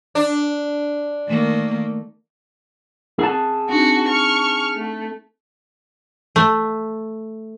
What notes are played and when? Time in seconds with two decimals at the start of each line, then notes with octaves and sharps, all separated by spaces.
0.15 D4
1.28 D#3 A3 A#3
3.19 C4 G#4 F#5 A5
3.69 C4 D4 D#4 F#4
4.08 C#6 F6
4.75 A3
6.36 A3